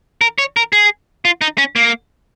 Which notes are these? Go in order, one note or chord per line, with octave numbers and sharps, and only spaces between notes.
A#4
C#5
A#4
G#4
F4
D#4
C#4
A#3